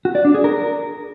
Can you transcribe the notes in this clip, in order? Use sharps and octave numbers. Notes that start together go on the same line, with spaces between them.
F#4
D5
D4
G#4
A#4